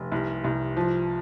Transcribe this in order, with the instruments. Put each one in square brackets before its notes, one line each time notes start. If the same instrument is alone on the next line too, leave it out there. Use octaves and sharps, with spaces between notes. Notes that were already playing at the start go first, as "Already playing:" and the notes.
Already playing: [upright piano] F1
C2
C2
F3